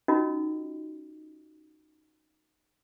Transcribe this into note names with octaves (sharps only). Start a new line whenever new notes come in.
C#4 D#4 F4 F#4 A#4 D#5